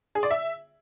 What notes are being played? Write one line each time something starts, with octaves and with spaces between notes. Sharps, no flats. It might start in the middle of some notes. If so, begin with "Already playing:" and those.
G#4
D5
E5